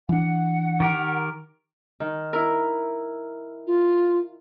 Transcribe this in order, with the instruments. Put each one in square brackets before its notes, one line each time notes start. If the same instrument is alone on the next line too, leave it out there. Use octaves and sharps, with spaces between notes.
[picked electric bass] E3 D4 [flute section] F#5
[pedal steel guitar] D#3 G4 A#4
[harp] D#3
E4 A#4
[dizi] F4